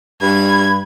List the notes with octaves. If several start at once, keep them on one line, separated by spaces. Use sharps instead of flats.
G2 B5 G#6